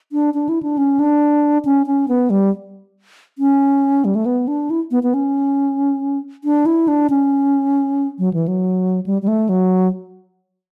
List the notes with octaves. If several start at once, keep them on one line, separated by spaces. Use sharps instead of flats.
D4
D4
E4
D4
C#4
D4
C#4
C#4
B3
G3
C#4
G3
A3
B3
D4
E4
B3
B3
C#4
D4
E4
D4
C#4
F#3
E3
F#3
G3
G3
A3
F#3